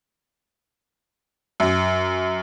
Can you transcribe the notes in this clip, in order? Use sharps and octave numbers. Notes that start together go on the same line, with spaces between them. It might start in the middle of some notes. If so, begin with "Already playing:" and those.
F#2